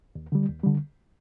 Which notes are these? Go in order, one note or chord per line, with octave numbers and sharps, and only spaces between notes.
D#2
D3 G3
D#2
D3 G3